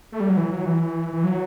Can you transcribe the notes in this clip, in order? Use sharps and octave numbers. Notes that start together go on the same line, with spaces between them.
A3
G3
F#3
E3
F#3
E3
E3
F#3